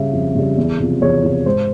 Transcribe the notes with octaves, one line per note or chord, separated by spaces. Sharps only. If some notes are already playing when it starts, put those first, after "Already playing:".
Already playing: C#3 G3 E5
F2
C#3 G3
E2
C3 F3
E2 C#5
C3 F3
G#2 C5